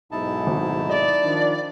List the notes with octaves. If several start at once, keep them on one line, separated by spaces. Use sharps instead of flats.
B1 G#2 D#4 E4 A5
G#1
D5 D#5
D#3 F3 D4